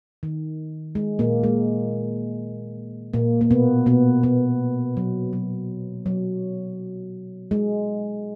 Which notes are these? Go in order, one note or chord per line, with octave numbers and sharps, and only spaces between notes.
D#3
G#3
A#2 A#3
G#3
A#2 A#3
A#3
B2 B3
B2 B3
B2 B3
F#3
F#3
F#3
G#3